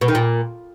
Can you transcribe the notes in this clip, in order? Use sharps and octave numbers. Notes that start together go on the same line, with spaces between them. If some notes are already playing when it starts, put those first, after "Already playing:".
B2
D#3
A#2